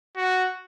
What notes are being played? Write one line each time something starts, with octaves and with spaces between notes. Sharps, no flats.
F#4